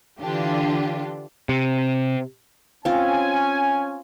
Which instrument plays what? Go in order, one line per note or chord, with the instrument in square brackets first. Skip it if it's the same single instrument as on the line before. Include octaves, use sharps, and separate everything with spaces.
[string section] D3 E3 D4 F4 G4
[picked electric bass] C3
[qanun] C4 F4 [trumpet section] C#4 G#5